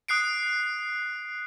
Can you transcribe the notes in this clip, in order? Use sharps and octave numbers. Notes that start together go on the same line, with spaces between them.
D#6 F#6 C7 D7